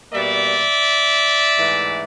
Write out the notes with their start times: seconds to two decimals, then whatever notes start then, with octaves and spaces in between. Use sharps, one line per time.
0.12 B2 G3 A#3 D5 E5
1.57 G#2 E3 A3